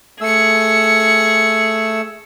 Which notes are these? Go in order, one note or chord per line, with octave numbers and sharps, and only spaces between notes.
A3 G#4 E6 C#7